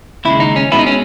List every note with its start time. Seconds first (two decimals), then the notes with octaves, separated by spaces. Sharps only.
0.25 D#2 C#3 G#3 E4
0.40 D#4
0.56 C#4
0.72 B2 G#3 B3 E4
0.79 D#4
0.86 C#4